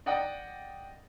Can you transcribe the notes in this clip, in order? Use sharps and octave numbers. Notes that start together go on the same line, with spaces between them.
D5 D#5 F#5 G5 D#6